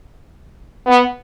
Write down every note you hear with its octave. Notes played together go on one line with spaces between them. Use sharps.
B3